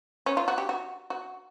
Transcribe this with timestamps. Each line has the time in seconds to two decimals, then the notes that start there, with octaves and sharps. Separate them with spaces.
0.26 C#4
0.37 F4
0.48 F#4
0.58 G4
0.69 F#4
1.10 F#4